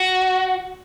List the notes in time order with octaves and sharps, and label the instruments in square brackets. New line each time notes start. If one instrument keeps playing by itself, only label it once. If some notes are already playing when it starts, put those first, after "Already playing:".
Already playing: [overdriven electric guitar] F#4